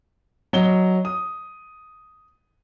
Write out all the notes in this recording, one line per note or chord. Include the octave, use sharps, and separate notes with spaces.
F#3 D#5 G7
D#6